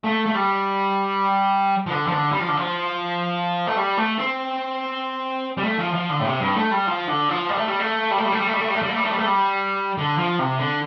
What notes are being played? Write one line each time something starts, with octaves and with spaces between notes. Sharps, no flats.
A3
A3
G3
F3
D3
F3
D3
G3
F3
D3
F3
A3
G3
A3
C4
G3
A3
F3
F3
D3
A2
C3
G2
A3
G3
F3
D3
F3
G3
A3
G3
A3
G3
A3
G3
A3
G3
A3
G3
A3
G3
A3
G3
A3
G3
A3
G3
A3
G3
D3
F3
C3
D3